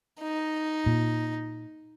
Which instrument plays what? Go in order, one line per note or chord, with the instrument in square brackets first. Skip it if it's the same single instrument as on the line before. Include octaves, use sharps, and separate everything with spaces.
[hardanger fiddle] D#4
[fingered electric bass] A#2